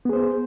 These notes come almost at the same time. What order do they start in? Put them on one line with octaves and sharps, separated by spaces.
B3 G#4 C5